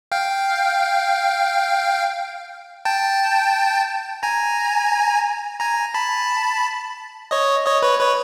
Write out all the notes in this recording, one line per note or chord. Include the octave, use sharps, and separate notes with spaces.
F5 G5
G5 A5
G#5 A#5
G#5 A#5
A5 B5
C#5 D#5
C#5 D#5
B4 C#5
B4 C#5